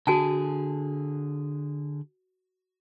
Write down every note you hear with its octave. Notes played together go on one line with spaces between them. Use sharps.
D3 F#4 G#4 G#5 A5